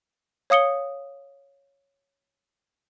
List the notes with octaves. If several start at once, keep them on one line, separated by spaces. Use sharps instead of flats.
C#5 F5 D#6 C#7 G7